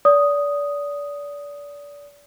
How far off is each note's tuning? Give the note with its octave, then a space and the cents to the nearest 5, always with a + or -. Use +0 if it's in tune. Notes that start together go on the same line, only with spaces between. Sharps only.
D5 -30 D#6 +0